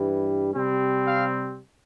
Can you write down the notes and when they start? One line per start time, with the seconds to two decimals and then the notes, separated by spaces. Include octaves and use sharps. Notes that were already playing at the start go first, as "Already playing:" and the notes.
Already playing: G2 E3 G3
0.55 C3 G3 C4
1.06 F5